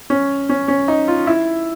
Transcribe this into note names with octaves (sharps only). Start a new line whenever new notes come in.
C#4
C#4
C#4
D#4
F4
E4